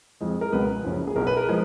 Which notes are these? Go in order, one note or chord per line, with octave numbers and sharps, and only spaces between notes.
F2 F3 G#3
A#4
C#2 B2 G#3 B4
F#1 F#2 C#3 F3
G#4
B1 B2 F#3 A#4
B4
A#4
F3 G#3